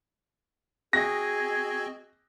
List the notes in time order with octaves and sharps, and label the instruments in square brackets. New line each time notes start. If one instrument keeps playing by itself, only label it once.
[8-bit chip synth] C4 F#4 D#5 [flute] G#4 [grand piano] A#6